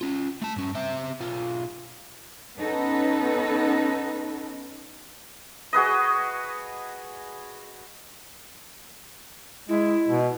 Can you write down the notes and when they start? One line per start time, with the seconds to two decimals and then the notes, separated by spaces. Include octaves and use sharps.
0.01 C#4 F4
0.42 A3 A5
0.56 G2 C#4
0.75 C4 E5
1.20 B1 F4
2.57 B3 C#4 D#4 A4 B4
5.73 F#4 G#4 B4 D#5
9.69 G#3 E4
10.09 B2